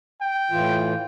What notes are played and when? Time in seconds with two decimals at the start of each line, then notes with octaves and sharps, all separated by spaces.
0.21 G5
0.51 A2 E3 F4